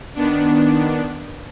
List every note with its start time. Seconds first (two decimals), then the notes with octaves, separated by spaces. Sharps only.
0.15 D#3 B3 D4